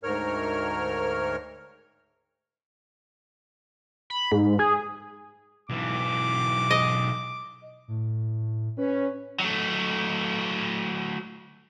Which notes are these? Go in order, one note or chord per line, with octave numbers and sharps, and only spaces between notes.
D2 G#2 A#4 C#5 F6
B5
G#2
G#4
B1 E3 D6
D#5
A2
C#4 B4
F#3 A3